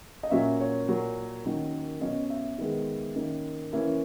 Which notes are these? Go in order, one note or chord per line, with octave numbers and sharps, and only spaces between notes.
D#5
A#2 F#3 C#4 E5
C#5
A#2 F#3 A#3
D#3 F#3 A#3 C#4
B2 F#3 C#4 D#5
E5
D#3 G#3 B3
D#3 A#3 C#4
E3 A#3 C#4 E5